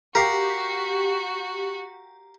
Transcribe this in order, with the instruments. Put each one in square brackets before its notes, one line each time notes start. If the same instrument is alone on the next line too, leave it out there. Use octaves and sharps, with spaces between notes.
[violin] F#4 [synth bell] G4 [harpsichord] A#4 F5